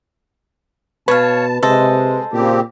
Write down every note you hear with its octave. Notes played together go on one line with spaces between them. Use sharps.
B2 B4 C#5 F5 A5
C3 G#3 A4 C5 D#5
A#2 C#3 C4 G4